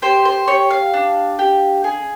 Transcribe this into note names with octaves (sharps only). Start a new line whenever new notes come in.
G4 C5
C5
G4 C#5
F5
D4
G4
G#4